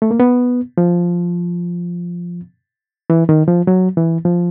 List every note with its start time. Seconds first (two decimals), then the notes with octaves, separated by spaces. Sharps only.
0.02 A3
0.11 A#3
0.20 B3
0.78 F3
3.10 E3
3.29 D#3
3.48 F3
3.67 F#3
3.97 E3
4.25 F3